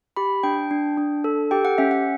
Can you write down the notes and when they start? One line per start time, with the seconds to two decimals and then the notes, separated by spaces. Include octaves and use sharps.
0.16 G4 B5
0.43 D4 G5
0.71 D4
0.98 D4
1.24 A4
1.51 G4 G5
1.65 F#5
1.78 C#4 E5
1.91 F#5